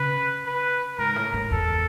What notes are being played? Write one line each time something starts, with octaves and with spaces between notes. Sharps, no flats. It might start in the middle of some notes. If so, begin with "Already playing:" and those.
Already playing: C#3 B4
B4
G#2 A#4
A2
G#2
E2 A4